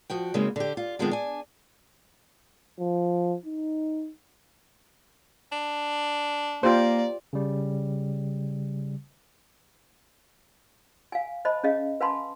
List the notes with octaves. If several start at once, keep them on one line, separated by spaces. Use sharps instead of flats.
F3 F#4 G5
C#3 F#3 G#3 A#3 C4 D#4
D3 G4
F4
D3 D#3 F3 G#3 B3 C4
D4 G#5
F3
D#4
D4
A#3 F4 G4 C5 D5
C#3 G3
F5 G#5
C5 D#5 A5 B5
C#4 G#4 D#5 F5
B4 F5 G#5 A5 B5 C6